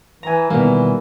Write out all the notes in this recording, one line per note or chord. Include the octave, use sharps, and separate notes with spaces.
E3 G#5 A#5
B2 D#3 E3 G3 A#3 B3